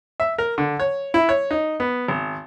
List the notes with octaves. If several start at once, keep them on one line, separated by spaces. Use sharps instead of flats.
E5
A#4
D3
C#5
E4
C#5
D#4
B3
G#1